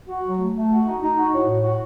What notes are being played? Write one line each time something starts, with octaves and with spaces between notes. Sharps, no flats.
F#4
F#3
A3
A3
F#4
D#4
D#4
F#4
A2
A2
F#4